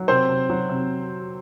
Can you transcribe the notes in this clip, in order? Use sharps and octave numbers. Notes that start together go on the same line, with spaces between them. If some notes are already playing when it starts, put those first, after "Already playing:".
Already playing: F#3
C3 C4 C5
C3
F#3
C3